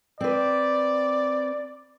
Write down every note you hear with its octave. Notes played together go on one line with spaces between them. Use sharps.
C4 B4 D5